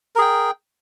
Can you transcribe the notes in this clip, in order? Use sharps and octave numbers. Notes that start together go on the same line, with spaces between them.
G#4 A#4 G5